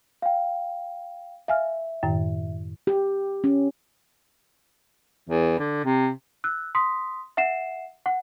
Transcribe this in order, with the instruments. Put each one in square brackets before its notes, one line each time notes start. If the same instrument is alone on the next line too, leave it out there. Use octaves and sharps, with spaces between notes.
[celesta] F5 G5
[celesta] E5 [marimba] F5 G#5 F6
[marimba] F#2 A2 D#3
[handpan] G4
C#4
[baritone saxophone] E2
D3
C3
[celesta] E6 F#6
C6 D#6 B6
E5 F#5 C7 E7
F#5